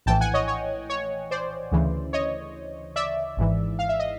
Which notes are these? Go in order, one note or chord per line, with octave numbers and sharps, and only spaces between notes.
A#1 A2 E3 G5 A5
F#5 G#5
C#5 D#5
C#5
C#5
C5 D5
D2 C#3 E3
C#5 D#5
D5 E5
G#1 G#2 E3
F5
E5
D#5